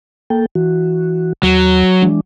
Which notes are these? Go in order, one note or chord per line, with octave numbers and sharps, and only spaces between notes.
A#3 A4 G5
E3 F#4
D#2 F#3
E3 G#3 D4